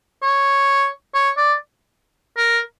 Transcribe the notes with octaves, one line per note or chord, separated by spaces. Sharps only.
C#5
C#5
D5
A#4